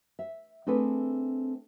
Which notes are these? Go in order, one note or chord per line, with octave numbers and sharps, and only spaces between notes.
E5
A3 C4 D4 G#4 A4 B4